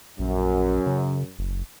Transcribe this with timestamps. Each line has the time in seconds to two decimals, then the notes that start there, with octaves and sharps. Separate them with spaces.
0.19 A#1 F#2
0.87 C#3
1.39 F#1